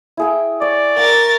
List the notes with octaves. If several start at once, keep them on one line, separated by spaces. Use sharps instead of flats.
E4 G#4 G5
C#5 D5
A#4 G5 A6